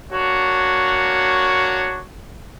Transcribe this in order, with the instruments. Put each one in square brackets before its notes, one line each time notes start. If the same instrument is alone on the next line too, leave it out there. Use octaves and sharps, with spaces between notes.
[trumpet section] A#3 D4 F#4 C#5